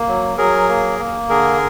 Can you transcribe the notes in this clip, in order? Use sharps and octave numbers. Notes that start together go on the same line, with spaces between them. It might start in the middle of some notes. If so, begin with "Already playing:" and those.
Already playing: A#3
F#3
F#3 G#4 A#4
A#3
A#3
D3 G#4 A#4